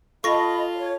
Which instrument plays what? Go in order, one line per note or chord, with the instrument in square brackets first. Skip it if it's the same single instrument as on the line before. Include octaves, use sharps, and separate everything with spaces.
[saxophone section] F4 [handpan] A4 [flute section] D#5 B5 [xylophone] C#6 A#6
[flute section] C#5